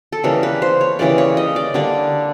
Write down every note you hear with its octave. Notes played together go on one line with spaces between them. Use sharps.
A4
C#3 E3 G3 A#3 A#4
B4
C5
C#5
C#3 E3 G3 A#3 D5
C#5
D#5
D5
D3 G3 A#3 D5